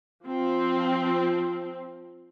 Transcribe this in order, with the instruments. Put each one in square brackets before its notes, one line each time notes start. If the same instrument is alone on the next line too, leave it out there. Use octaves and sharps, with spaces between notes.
[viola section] F3 C4